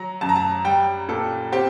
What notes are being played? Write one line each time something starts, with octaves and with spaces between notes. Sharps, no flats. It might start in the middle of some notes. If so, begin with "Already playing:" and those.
Already playing: F#3 A#5
F#2 A5
A#5
A5
G3 G5
A#2 A4
C4 G4